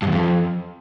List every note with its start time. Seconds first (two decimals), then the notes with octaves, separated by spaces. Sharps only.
0.02 G2
0.07 E2
0.12 F2